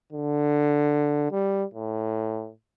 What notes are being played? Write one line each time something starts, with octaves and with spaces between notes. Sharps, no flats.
D3
G3
A2